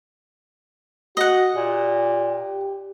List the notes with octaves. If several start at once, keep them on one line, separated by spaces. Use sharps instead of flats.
F#4 D#5 F#5
A#2 G4